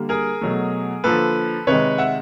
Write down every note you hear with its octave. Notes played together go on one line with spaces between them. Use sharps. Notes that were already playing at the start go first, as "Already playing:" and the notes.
Already playing: D3 G3 A#3
G#4 A#4
B2 F#3 A3
D3 F3 A#3 A4 B4
C3 D#3 G#3 B4 C#5
E5 F#5